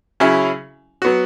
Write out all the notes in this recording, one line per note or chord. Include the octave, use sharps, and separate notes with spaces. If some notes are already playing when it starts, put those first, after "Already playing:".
C#3 F#3 C#4 E4 G#4
F#3 B3 F#4